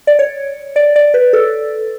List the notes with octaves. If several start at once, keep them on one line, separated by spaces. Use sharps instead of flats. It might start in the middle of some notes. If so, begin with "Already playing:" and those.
D5
C#5
D5
D5
B4
A4